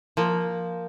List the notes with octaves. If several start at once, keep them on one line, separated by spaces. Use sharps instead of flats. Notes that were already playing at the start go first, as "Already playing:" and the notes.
F3 A#3